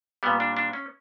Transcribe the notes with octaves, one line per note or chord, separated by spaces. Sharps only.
A#2 G3 B3
D4
D4
C#4